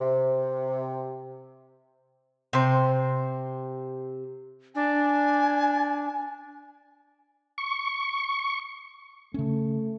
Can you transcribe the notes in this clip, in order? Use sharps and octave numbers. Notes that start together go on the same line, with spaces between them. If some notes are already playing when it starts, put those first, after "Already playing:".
C3
C3 C5
D4 G#5
C#6
C#3 A3 C#4